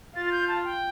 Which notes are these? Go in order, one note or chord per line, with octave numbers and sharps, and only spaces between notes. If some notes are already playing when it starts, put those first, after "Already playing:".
F4 A6
A6
G6
A5
G5